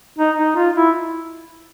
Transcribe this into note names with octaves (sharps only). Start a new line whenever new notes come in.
D#4
D#4
F4
E4